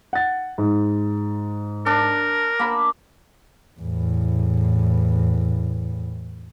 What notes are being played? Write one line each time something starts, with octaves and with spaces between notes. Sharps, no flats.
F#5 A6
G#2
D4 A#4
A#3 B5
E2 A2